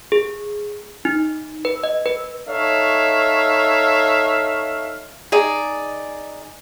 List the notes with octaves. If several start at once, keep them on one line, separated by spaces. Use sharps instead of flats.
G#4
D#4
B4
D#5
B4
D#4 A4 C#5 E5 F5
D#4 G#4 D5